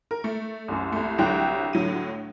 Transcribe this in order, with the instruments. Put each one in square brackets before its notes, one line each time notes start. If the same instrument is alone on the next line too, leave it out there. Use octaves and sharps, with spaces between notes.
[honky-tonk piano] A#4
A3
C2 F#2
C2 A3
C2 D3 F#3 G5 F#6
A2 D3 F#3 D#7